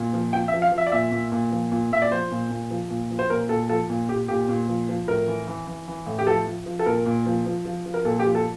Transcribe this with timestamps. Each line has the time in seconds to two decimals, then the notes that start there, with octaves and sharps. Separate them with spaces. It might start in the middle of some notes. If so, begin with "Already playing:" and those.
Already playing: A#2
0.13 F3
0.33 F3 G5
0.48 E5
0.53 F3
0.62 F5
0.72 F3
0.78 E5
0.87 D5
0.92 A#2 E5
1.12 A#2
1.32 A#2
1.52 F3
1.72 A#2
1.92 A#2 E5
2.02 D5
2.11 F3 C5
2.31 A#2
2.51 A#2
2.70 F3
2.90 A#2
3.10 F3
3.19 C5
3.30 A#2 A#4
3.49 A#2 A4
3.69 F3 A4
3.90 A#2
4.09 A#2 G4
4.28 A#2 G4
4.49 A#2
4.68 F3
4.89 F3
5.08 A2 A#4
5.28 E3
5.48 E3
5.67 E3
5.88 E3
6.06 A2
6.19 G4
6.27 F3 A4
6.46 F3
6.66 F3
6.79 A4
6.86 A#2 A#4
7.06 A#2
7.26 F3
7.46 F3
7.65 F3
7.86 F3
7.94 A#4
8.05 A#2 A4
8.19 G4
8.25 F3
8.35 A4